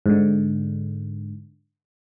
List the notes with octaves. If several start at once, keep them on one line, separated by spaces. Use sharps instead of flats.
G#2 D3